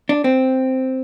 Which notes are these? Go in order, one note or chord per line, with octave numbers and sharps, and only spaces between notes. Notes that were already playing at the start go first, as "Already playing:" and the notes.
D4
C4